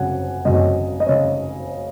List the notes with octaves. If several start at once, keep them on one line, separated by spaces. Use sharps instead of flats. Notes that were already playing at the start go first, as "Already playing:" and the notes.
Already playing: G#1 F#2 C#3 F#5 G#5
G#1 F#2 C#3 D#5
D#5
C#3 C#5